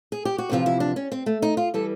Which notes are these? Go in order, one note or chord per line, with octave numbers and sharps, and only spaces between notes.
G#4
G4
F#4
E2 C3 F3 F4
E4
D4
C#4
C4
A3
D#4
F4
E3 G3 A4